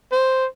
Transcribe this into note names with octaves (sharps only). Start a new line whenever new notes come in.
C5